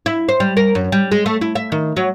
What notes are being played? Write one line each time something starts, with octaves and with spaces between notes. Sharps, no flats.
E4
C5
G3
A#4
F#2
G3
G#3
A3
E4
E5
D#3
F#3